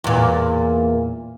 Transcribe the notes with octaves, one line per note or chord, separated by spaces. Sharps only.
E2 A#2